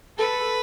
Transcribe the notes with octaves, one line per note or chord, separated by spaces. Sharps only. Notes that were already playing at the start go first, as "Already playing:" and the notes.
A4 B4